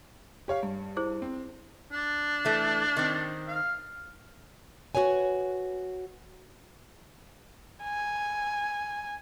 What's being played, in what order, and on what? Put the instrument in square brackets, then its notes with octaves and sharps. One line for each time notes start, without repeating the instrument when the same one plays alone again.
[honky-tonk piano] G4 C#5 F5
G2
[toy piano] E4 G#4 C5
[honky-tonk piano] C4
[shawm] D4
[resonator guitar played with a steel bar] E3 A3
D#3 C4
[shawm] F5
[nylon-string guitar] F#4 G#4 B4 C#5 G#5
[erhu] G#5